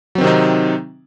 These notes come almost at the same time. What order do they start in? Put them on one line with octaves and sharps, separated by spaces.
F#3 C4 D#3 C3 D#4